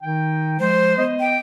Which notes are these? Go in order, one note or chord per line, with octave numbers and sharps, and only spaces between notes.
D#3 D#4 G5
F3 G#3 C5
B3 D#5
G5